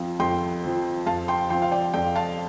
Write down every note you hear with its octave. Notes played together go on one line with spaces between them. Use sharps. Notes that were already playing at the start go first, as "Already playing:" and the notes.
Already playing: F2 F3 C4 F5
F2 G5 C6
F3 C4
F2 F5 A5
G5 C6
F3 C4 G5 C6
F5
D5 G5
F2 D5 G5
F5 A5